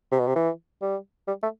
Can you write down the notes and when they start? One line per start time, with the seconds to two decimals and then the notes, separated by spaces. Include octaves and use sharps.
0.12 C3
0.19 B2
0.27 C3
0.36 E3
0.82 G3
1.27 G3
1.43 A3